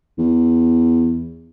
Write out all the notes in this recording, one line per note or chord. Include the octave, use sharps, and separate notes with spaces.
E2